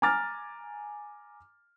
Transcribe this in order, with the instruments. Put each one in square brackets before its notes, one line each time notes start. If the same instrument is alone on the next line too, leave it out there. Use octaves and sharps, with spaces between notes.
[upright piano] G#5 A#5 D6 F6 A6